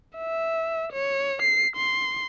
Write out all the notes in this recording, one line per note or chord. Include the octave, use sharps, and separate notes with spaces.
E5
C#5
C7
C6